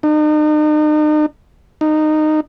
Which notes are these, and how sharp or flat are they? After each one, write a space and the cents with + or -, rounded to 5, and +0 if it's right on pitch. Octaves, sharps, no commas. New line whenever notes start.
D#4 -40
D#4 -15